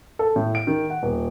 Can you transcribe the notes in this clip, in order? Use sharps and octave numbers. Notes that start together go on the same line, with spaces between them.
A4
A2
D7
D#3
F#5
D#1